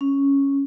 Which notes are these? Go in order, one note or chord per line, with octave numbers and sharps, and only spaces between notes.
C#4